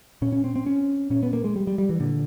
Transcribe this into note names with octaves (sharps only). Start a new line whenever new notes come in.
A#2 C#4
C#4
C4
C4
C#4
A#2 C#4
B3
A#3
G#3
G3
G3
G3
E3
A#2 D3